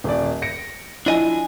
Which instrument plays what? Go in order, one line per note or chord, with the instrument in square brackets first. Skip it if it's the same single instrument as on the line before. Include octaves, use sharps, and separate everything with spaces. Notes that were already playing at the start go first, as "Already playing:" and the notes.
[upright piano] D#1 D5
A#6 C#7 D7
[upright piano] F3 E4 [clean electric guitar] D4 D#5 G#5